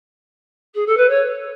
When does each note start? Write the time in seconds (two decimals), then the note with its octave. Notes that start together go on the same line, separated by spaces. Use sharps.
0.74 G#4
0.86 A4
0.97 B4
1.09 C#5